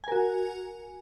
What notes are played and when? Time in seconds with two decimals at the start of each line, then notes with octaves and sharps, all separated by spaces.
0.04 G#5
0.08 A#4
0.12 F#4